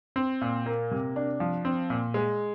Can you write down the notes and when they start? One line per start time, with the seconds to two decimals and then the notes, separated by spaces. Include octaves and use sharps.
0.16 C4
0.41 A#2
0.66 A#3
0.91 C3
1.16 D4
1.40 F3
1.65 C4
1.90 A#2
2.14 G#3